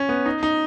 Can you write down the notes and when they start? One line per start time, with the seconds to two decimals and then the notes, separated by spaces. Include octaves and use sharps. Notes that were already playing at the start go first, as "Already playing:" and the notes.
Already playing: C#4
0.09 B3
0.26 D#4
0.43 D#4